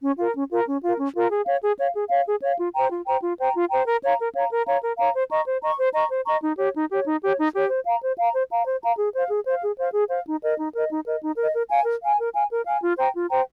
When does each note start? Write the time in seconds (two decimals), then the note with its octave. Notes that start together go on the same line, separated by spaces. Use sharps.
0.02 C#4
0.18 F4 A#4
0.35 C#4
0.50 F4 A#4
0.67 C#4
0.82 F4 A#4
0.98 C#4
1.14 F4 A#4
1.30 G#4
1.46 C#5 F5
1.62 G#4
1.78 C#5 F5
1.94 G#4
2.10 C#5 F5
2.26 G#4
2.42 C#5 F5
2.58 F4
2.74 C5 G5 A#5
2.90 F4
3.06 C5 G5 A#5
3.22 F4
3.38 C5 G5 A#5
3.55 F4
3.70 C5 G5 A#5
3.86 A#4
4.03 C#5 F5 A#5
4.19 A#4
4.34 C#5 F5 A#5
4.51 A#4
4.66 C#5 F5 A#5
4.81 A#4
4.98 C#5 F5 A#5
5.14 C5
5.30 D#5 A#5 C#6
5.46 C5
5.62 D#5 A#5 C#6
5.78 C5
5.93 D#5 A#5 C#6
6.10 C5
6.26 D#5 A#5 C#6
6.42 D#4
6.58 G4 C#5
6.74 D#4
6.90 G4 C#5
7.06 D#4
7.22 G4 C#5
7.37 D#4
7.55 G4 C#5
7.70 C5
7.86 F5 A#5
8.02 C5
8.18 F5 A#5
8.34 C5
8.50 F5 A#5
8.66 C5
8.82 F5 A#5
8.98 G#4
9.14 C5 F5
9.30 G#4
9.46 C5 F5
9.62 G#4
9.78 C5 F5
9.94 G#4
10.09 C5 F5
10.26 D#4
10.42 A#4 D#5
10.58 D#4
10.74 A#4 D#5
10.90 D#4
11.06 A#4 D#5
11.21 D#4
11.37 A#4 D#5
11.54 A#4
11.70 F5 G#5
11.86 A#4
12.02 F5 G#5
12.17 A#4
12.34 F5 G#5
12.49 A#4
12.66 F5 G#5
12.82 F4
12.97 C5 G5 A#5
13.14 F4
13.30 C5 G5 A#5